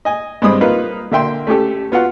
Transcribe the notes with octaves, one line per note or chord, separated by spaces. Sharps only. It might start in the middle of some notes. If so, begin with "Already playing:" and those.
D#5 G#5
G2 G#3 C4 B5 D#6
A#3 D#4 F4 B4
D3 A#3 E5 G5 C6
A3 C#4 G4 A4
B3 F4 F#4 F#5